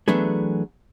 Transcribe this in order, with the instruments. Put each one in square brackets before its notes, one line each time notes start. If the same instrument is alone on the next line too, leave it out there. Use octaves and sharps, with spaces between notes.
[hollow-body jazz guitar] E3 F#3 A3 B3 D4 G#4